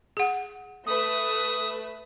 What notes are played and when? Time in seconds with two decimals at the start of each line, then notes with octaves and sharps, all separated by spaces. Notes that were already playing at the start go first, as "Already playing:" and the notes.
0.17 G#4 F#5
0.87 A3 B4 E5 D#6